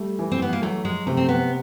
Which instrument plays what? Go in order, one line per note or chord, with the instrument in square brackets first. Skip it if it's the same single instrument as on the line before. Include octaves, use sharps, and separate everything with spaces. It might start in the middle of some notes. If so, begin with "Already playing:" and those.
Already playing: [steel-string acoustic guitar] G3 [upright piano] A3
[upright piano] E3
[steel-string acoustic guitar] C4
B3
A#3
[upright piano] F#3 [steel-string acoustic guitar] A3
[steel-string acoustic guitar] G#3
[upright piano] C3 [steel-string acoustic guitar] A3
[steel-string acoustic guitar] C4
B3